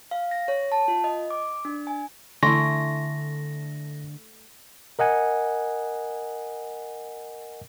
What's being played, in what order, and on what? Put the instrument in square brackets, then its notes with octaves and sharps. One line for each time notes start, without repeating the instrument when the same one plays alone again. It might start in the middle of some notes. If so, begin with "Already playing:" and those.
[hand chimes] F5
A#6
C#5
A5
F4
D#5
D6
D4
G#5
[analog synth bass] D3 [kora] A3 E4 [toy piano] G#5 C6 C#6 [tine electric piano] A#6
[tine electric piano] A#4 D#5 F#5 G#5